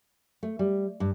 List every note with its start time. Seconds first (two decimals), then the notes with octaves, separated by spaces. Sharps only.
0.43 A3
0.59 G3
1.00 G2